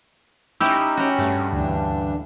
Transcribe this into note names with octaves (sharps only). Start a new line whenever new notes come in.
C#4 D#4 E4 G4 E6
C#4 F#4 G4
G2 A3
D2 E3 D4